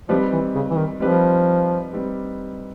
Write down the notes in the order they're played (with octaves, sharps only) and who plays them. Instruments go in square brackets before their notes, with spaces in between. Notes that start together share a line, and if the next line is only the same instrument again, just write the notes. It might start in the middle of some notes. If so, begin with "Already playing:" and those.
[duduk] F3 [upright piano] G3 C4 D#4 G4 B4
[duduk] E3
C#3
E3
D#3
[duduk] F3 [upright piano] G3 C4 D#4 G4 B4
[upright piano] G3 C4 D#4 G4 B4